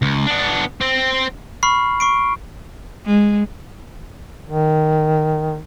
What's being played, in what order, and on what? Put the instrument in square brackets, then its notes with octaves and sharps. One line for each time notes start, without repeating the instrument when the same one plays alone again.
[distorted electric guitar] C#2
B3 D4
C4 C5
[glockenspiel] B5 C#6 F6 C7
C#6 C7 D7
[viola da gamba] G#3
[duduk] D#3